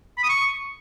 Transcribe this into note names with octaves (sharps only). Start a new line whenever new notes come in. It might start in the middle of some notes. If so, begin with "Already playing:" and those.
B5
D#6
C#6